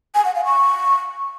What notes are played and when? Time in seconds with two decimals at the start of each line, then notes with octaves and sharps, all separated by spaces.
0.15 G#5
0.25 F#5
0.35 F5
0.45 C#6